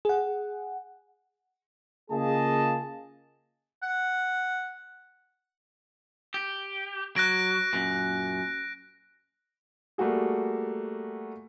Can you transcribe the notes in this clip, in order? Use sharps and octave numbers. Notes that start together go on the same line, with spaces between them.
G#4 F#5
C#3 A#3 F4 G#4 D#5 A5
F#5
G4
F#3 F#6 A#6 D7
F#2 A#2
G3 A3 A#3 F#4 G#4